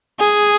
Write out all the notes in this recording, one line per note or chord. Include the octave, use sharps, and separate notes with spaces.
G#4